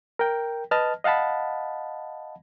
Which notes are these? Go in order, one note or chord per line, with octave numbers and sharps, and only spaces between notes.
A#4 G5
B4 D#5 A5 F6
D#5 F5 F#5 A5 B5